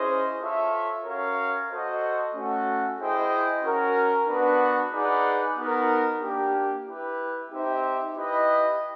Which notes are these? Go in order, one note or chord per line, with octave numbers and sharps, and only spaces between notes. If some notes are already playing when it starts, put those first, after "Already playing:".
Already playing: C#4 E4 G#4 C5 D#5
F4 A4 C#5 E5
C#4 F#4 A#4 C#5 F5
F#4 A4 C5 D#5
A3 C#4 F#4 A4
E4 G#4 C5 D#5 G5
C#4 F#4 A#4
B3 D4 F#4 B4
D#4 G#4 B4 D5 F#5
B3 D#4 F#4 A#4
A#3 D4 G4
E4 G4 B4
C4 D#4 G4 C5 E5
E4 G4 B4 D#5